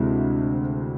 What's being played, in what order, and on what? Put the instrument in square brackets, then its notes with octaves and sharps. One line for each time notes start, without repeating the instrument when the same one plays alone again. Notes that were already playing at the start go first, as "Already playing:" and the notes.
Already playing: [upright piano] D2 C3 G#3 E4